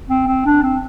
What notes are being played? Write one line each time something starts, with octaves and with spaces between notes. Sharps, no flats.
C4
C4
D4
C4